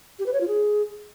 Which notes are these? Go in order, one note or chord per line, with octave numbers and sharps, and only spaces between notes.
G4
B4
C#5
F4
G#4